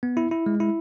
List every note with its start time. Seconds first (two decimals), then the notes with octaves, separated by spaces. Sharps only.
0.03 B3
0.17 E4
0.31 E4
0.46 G#3
0.60 E4